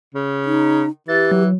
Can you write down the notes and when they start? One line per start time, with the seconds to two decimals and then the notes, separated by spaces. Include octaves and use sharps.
0.15 C#3
0.45 D#4
1.08 E3 G4 A6
1.31 F#3